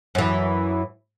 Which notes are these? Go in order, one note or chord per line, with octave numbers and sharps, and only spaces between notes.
F#2 E3